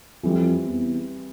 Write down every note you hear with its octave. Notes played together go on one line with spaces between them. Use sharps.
F2 E3 G3 C4
E2